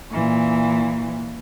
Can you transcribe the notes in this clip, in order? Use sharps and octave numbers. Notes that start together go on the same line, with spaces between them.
A#2 E3